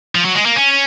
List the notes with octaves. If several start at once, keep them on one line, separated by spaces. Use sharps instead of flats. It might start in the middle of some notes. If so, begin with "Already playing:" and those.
F3
F#3
G#3
A#3
C#4